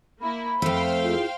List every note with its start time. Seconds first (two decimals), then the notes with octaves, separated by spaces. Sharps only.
0.21 A#3 E4 B5
0.62 F2 A3 C5 F5 G5
1.03 E4 F4 G#4